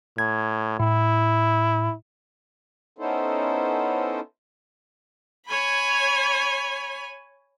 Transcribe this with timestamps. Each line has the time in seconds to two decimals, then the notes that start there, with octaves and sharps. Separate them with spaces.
0.18 A2 G#6
0.80 A2 E4
2.99 B3 C#4 D#4 E4 A4 C5
5.46 C#5 G#5 B5